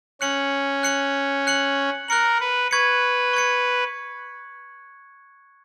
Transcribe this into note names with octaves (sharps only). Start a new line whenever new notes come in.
C#4 F#6 C#7 F#7
F#6 C#7 F#7
F#6 C#7 F#7
A#4 F#6 C#7 F#7
B4
B4 C#6 G#6 C#7
C#6 G#6 C#7